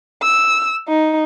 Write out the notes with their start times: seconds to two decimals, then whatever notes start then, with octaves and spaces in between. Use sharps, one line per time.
0.23 E6
0.88 D#4